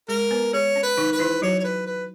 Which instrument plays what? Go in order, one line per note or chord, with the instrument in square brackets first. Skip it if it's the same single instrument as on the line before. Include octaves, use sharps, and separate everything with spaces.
[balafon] G#3 G#4 [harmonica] A#4
[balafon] B3 B4
[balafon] G#3 G#4 [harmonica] C#5
[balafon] C#4
[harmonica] B4
[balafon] D#3 D#4
[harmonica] B4
[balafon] E3 E4
[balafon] F#3 F#4 [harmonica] C#5
[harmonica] C#5
B4
B4